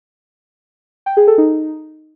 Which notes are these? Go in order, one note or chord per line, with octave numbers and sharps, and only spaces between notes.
G5
G#4
A4
D#4